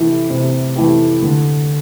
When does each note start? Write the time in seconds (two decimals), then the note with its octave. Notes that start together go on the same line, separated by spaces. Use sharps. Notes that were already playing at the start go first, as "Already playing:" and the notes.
Already playing: C3 E3 A3 E4 G4
0.30 C3
0.76 E3 A3 E4 G4
1.22 D3